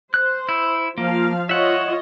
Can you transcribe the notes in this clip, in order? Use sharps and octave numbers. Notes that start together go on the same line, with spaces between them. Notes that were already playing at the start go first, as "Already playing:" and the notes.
C5 F#6
E4
F3 A#3 F5
F4 C#5 D#5 E5 F#5